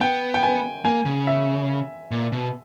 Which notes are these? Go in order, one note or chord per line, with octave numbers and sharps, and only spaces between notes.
B3 G5
G5
G#5
A#3 G#5
C#3
E5
A#2
B2